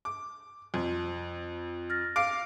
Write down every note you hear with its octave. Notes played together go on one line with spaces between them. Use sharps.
D6
F2
F6 A6 A#6
F5 D6 D7